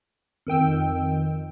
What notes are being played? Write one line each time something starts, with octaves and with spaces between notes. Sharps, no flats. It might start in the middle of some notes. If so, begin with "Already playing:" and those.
F2 D#3 G5 E6